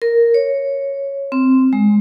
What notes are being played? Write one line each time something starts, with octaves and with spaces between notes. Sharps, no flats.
A#4
C#5
C4
G#3